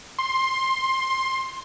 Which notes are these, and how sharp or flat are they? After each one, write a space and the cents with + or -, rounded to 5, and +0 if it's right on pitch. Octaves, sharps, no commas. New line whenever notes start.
C6 +15